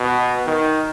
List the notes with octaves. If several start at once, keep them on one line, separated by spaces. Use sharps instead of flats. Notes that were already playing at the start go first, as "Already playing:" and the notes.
Already playing: B2
D#3